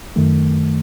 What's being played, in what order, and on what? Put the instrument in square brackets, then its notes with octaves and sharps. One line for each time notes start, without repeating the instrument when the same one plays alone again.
[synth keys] F#2 D#3 A3